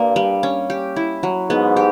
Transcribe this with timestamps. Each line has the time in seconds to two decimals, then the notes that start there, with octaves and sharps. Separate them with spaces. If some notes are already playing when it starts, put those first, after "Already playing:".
Already playing: G2 A#3
0.16 G3
0.43 C#4
0.70 G4
0.96 E4
1.23 F#3
1.50 G#2 B3
1.77 G4